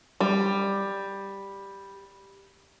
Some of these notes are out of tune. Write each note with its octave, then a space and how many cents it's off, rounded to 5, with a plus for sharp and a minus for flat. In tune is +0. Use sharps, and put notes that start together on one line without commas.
G3 +5